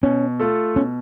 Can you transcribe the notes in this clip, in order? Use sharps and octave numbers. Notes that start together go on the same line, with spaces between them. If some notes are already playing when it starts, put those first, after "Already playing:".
B2 C#4
A3 F4 A4
B2 C#4